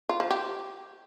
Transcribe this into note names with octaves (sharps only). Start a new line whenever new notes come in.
F4
F3
G4